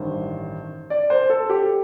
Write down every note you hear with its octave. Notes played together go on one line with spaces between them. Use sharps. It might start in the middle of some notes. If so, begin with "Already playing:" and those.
Already playing: A1 G2 D#3 C5
D5
C5
A4
G4